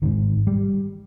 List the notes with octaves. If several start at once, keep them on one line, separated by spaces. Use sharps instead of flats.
G#1 G#2 D#3
G3